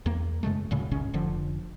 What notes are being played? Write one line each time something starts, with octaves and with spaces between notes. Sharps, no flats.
E2 A#3
F#2 C#3 G#3 A3
D2 A2 C#3
G1 C#2 C#3 C#4
F1 D3 F3